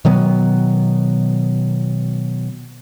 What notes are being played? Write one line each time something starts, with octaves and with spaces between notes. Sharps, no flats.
B2 D#3 F#3 B3